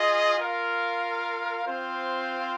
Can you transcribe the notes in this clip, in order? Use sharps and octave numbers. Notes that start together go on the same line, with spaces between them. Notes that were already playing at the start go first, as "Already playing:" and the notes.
Already playing: F4 G#4 D#5
F4 A#4 F5
C4 F4 C5 F5